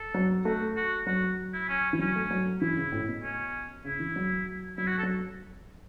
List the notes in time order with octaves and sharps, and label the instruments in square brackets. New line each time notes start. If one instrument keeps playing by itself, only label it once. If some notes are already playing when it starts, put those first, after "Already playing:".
Already playing: [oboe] A4
[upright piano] F#3
[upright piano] A3 [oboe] F#4
[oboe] F#4
[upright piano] F#3 [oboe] F#4
[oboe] E4
C#4
[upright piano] E3
[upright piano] F#3 [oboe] C#4
[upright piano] A3
F#3
[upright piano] E3 [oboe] E4
[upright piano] C#3
A2
B2
[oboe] C#4
[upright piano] C#3 [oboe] E4
[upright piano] E3
F#3
[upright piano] F#3 [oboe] E4
[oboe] F#4
A4
[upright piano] F#3